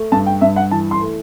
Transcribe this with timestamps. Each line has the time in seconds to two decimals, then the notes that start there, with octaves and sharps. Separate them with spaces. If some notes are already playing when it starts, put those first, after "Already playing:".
Already playing: A3
0.12 G2 A5
0.26 G5
0.41 G2 E5
0.56 F#5
0.71 E3 A5
0.91 C6
1.01 A3